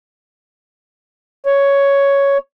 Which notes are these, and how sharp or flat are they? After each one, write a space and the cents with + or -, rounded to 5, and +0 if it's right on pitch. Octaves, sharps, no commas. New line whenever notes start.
C#5 +5